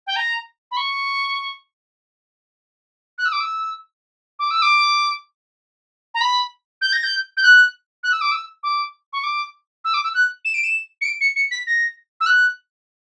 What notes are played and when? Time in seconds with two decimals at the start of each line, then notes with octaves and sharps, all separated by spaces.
0.07 G5
0.16 A#5
0.71 B5
0.77 C#6
3.18 F#6
3.25 E6
3.32 D6
3.40 E6
4.39 D6
4.50 E6
4.62 D6
6.14 A#5
6.21 B5
6.81 G6
6.92 A#6
7.03 G6
7.37 G6
7.43 F#6
8.03 F#6
8.11 E6
8.21 D6
8.31 E6
8.63 D6
9.13 C#6
9.23 D6
9.84 E6
9.94 D6
10.03 E6
10.14 F#6
10.45 E7
10.54 D7
10.63 E7
11.01 C#7
11.05 D7
11.20 C#7
11.36 C#7
11.51 B6
11.66 A#6
12.20 E6
12.26 F#6